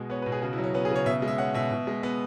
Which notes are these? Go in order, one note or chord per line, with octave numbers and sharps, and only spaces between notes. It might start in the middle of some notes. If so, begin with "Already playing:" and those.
Already playing: B2 G#3 F#4
B3 C#5
B2 B4
G#4
C#3 F#4
E4
F#3
C#4
B3 C#4
G#4
C#3
C#5
B2 E5
G#3
E5
C#4 F#5
B2 E5
B2
G#3
B3